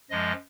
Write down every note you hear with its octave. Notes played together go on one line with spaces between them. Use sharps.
F#2 F3 G#3 D#5